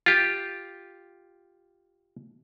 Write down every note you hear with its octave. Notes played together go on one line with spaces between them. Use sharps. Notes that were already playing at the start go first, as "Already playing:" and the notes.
F4 G4